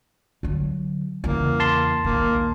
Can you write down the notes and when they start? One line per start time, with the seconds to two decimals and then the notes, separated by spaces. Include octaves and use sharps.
0.43 D3 F#3
1.24 E2 C#3 A#3
1.60 A5 C6
2.04 A#1 D#2 A#3